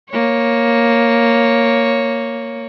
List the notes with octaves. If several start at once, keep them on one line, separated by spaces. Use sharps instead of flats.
A#3 C#5